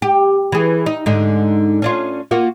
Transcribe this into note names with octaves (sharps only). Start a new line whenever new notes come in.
G4
E3 G#4
D#4
G#2 D3 D#4
C#4 D4 F4
A#3 F4 F#4